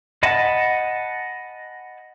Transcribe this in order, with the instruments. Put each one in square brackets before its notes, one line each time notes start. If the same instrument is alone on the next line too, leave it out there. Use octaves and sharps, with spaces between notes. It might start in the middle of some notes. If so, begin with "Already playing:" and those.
[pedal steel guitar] D#5 F#5 G#5 A5 B5